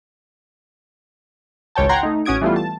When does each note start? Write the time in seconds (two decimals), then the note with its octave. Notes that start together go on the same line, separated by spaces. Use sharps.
1.75 G#1 C#2 C#5 G5 A5
1.89 F#5 G5 A#5 C6 G#6
2.03 A3 D#4
2.25 A1 C#4 F#4 D#6 G#6 D7
2.41 E3 G3 A3 B3 F4
2.56 A5